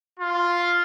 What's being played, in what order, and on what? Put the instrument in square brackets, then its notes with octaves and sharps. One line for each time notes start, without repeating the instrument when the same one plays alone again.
[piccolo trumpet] F4